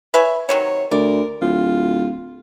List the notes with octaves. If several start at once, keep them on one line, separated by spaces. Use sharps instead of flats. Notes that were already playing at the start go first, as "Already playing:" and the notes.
B4 C#5 E5 G#5
C3 D#3 F#3 C#5
D2 A#4 D5
D1 F4